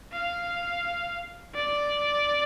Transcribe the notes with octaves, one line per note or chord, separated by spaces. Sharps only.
F5
D5